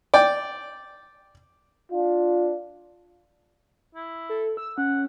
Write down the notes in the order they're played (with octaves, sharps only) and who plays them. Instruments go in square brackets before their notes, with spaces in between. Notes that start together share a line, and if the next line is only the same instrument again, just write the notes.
[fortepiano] D5 G5
[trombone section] D4 F4
[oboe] E4
[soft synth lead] A4
E6
[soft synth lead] C#4 [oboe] F#5